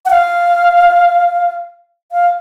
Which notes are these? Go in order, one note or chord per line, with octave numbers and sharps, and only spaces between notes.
F#5
F5
F5